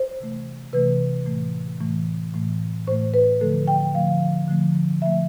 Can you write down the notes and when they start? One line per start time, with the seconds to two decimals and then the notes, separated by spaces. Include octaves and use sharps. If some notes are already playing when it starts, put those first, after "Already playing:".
Already playing: C5
0.20 C3 E3 A3
0.73 C3 E3 A3 B4
1.26 A2 E3 A3
1.80 A2 E3 A3
2.34 A2 E3 A3
2.87 A2 E3 A3 C5
3.14 B4
3.41 D3 F3 A3 A4
3.67 G5
3.94 D3 F3 A3 F5
4.48 D3 F3 A3
5.01 D3 F3 A3 E5